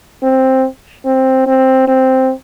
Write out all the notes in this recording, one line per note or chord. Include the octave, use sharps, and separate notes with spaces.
C4
C4
C4
C4